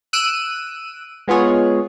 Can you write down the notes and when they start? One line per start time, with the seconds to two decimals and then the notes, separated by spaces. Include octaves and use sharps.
0.13 E6 F#6 D7 D#7
1.28 G#3 B3 F4 G#4 C#5